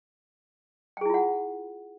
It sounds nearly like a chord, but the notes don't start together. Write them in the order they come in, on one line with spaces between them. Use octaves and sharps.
G5 G#4 E4 F4 F#5